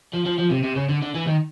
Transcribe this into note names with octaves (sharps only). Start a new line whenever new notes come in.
F3
F3
F3
C3
C3
C#3
D3
D3
E3
D#3